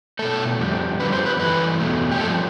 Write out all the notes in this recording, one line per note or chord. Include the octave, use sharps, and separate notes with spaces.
B2 A3 A4
F2 D3 G3
F2 D3 G3 B4
C5
B4
G2 E3 A3 B4
E2 B2 A3
G4
G2 F3 A3 A4